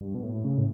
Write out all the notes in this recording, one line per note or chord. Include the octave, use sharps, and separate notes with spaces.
G2
B2
A2
C#3
A2